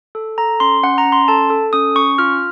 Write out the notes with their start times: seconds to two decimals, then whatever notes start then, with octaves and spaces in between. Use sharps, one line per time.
0.15 A4
0.38 A4 A#5
0.60 C#4 C6
0.83 C#4 F#5
0.98 A#5
1.05 C#4
1.12 C6
1.28 A4 A5
1.50 A4
1.73 C#4 D#6
1.95 C#4 C#6
2.18 F4 F6